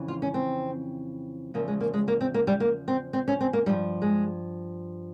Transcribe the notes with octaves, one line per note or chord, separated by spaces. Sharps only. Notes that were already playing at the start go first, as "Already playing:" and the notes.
Already playing: F2 C#3 E3
F4
C#4
C4
E2 C#3 F3 A#3
G#3
A#3
G#3
A#3
C4
A#3
G3
A#3
C4
C4
C#4
C4
A#3
G2 F3 G3
G#3